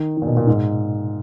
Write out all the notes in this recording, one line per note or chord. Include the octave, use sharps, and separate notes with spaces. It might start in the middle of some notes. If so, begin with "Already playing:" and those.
Already playing: D#3
D#3
A#2
B2
A#2
G#2